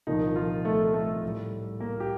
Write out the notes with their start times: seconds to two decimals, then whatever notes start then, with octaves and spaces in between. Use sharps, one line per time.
0.07 C2 A#2 D#3 F3 D#4
0.36 F3 F4
0.65 A3 A4
0.94 A3 A4
1.23 A2 G3
1.80 A#3 A#4
2.00 G4